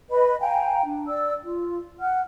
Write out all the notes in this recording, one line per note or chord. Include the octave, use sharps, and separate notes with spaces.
B4 D#5 B5
F5 G5 G#5 A#5
D4
D5 E6
F4
F#5 F6